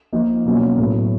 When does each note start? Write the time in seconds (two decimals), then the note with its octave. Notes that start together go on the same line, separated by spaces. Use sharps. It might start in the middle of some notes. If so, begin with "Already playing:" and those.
0.13 F3 A#3 D#4
0.45 B2 F#3 A#3 C#4
0.78 A2 F#3 B3